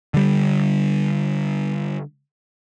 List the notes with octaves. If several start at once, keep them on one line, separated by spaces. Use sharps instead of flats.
D3 G3